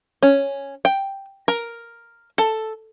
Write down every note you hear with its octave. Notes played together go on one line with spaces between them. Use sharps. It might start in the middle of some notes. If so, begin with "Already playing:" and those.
C#4
G5
A#4
A4